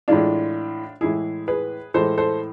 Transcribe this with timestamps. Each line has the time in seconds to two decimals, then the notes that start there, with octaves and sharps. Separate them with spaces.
0.08 A2 E3 G#3 D4 F4
1.01 A2 E3 G#3 E4 G#4
1.48 G#4 B4
1.94 A2 E3 G#3 A4 C5
2.17 A4 C5